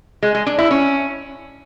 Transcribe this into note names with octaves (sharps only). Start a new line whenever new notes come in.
G#3
G#3
D4
E4
C#4